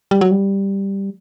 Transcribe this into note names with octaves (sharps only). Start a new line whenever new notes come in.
G3
F#3
G3